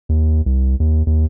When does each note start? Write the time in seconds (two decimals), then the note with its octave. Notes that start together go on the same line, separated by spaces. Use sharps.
0.09 D#2
0.46 C2
0.80 D#2
1.07 D#2